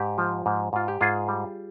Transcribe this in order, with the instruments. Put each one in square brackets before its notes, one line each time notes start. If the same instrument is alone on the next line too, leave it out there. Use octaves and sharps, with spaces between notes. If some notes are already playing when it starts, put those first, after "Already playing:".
Already playing: [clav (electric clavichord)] G#2 G4
F3
G#2
G#2 F4
G4
G#2 F4 G#4
G3